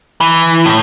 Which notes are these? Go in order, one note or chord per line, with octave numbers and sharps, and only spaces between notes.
E3
A2